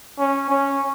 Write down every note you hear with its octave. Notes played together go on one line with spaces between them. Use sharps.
C#4
C#4